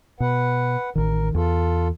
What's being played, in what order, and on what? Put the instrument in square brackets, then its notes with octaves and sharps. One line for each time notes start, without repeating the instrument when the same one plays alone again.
[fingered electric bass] B2 [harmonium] B4 F#5
[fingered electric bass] A1 D#3 [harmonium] A#4
[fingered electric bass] E2 [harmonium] F4 A4